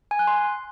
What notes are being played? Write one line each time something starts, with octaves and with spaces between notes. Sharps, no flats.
G#5
F#6
C6